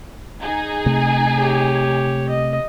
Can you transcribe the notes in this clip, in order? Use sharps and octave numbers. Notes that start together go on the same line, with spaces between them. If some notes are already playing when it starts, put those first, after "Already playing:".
D#4 G#4 G#5
C3 A3
G4 C#5
D#5